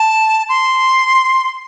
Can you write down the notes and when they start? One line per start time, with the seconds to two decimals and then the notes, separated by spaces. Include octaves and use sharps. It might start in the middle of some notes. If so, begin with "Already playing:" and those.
Already playing: A5
0.49 C6